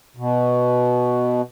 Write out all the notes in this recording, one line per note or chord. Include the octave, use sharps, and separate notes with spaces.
B2